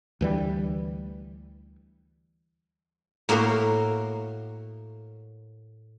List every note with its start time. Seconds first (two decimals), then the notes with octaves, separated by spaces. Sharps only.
0.21 D2 E3 G3
3.29 A2 A#3 F#4 A#4 C6